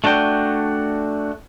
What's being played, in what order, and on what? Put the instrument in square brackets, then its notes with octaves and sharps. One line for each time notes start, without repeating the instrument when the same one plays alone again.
[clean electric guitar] A3 D4 F#4 G5